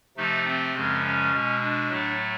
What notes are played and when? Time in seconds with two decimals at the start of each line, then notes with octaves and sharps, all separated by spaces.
0.17 C3 F3 A3 D#4
0.45 C4
0.74 F#2 C#3 F3 G#3
1.03 C#4
1.31 B2 G#3
1.61 D4
1.89 A2 F#3 A3